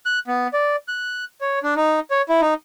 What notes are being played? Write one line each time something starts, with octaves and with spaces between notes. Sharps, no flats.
F#6
B3
D5
F#6
C#5
D4
D#4
C#5
E4
D#4